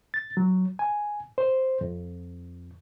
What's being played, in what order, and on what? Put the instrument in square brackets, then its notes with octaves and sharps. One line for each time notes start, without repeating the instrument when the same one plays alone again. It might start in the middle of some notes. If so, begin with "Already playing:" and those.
[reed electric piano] A6
F#3
G#5
C5
F2